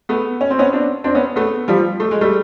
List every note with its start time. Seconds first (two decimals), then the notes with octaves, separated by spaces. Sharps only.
0.09 A3 B3
0.41 C#4
0.50 C4
0.59 B3 C#4
0.72 C4 D4
1.04 C4 D4
1.15 B3 C#4
1.36 A3 B3
1.68 F3 G3
2.00 A3
2.11 G#3
2.21 G3 A3